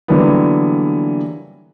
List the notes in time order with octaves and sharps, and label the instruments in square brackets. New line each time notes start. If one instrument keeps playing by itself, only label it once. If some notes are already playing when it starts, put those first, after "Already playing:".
[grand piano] D3 E3 F#3 G3 A#3 B3